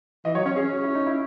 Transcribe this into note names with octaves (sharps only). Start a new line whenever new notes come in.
E3 D#5
F#3 C#5
C#4 C#5
C#4 G#4
F#4
E4
D#4
E4